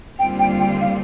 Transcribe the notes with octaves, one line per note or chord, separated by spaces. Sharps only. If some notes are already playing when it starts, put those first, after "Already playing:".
D#2 D3 G3 C4 F4 G5
G5
G5
F5